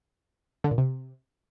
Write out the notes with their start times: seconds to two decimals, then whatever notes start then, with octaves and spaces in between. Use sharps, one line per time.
0.64 D3
0.71 A#2
0.78 C3